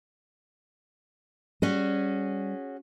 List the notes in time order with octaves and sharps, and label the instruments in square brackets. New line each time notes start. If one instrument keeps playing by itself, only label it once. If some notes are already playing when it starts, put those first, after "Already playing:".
[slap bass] G3 [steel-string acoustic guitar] C#4 F#4 G#4